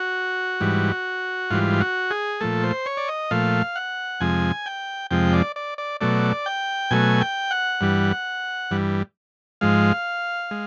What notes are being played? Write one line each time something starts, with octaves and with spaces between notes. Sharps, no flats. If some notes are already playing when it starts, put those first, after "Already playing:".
Already playing: F#4
G#2 E3 G3
G#2 E3 G3 F4
F#4
G#4
A#2 F3 A3 A4
C5
C#5
D5
D#5
A#2 F3 A3 F5
F#5
F2 C3 F3 G#3 G#5
G5
F2 C3 F3 G#3 G5
D5
D5
D5
B2 F#3 A3 D5
G5
B2 F#3 A3 G#5
G5
F#5
G2 E3 G3
G2 E3 G3
G#2 F3 G#3 F5
G#3